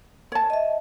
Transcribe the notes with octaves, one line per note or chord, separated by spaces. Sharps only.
C#5 A5
D#5 E5